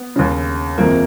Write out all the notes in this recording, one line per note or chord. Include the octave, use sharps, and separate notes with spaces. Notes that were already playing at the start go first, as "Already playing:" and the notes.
Already playing: B3
D#2 C#3
F#1 F2 D#3 A#3